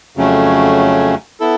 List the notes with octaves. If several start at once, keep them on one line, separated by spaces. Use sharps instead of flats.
F2 C#3 F#3 A3 C#4
B3 E4 A4